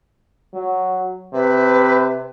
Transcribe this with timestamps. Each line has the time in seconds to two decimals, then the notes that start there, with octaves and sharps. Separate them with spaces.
0.54 F#3
1.33 C3 B4